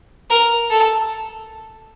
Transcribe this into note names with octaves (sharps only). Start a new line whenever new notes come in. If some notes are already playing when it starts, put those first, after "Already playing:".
A#4
A4